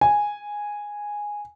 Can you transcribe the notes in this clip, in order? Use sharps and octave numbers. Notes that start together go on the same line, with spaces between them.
G#5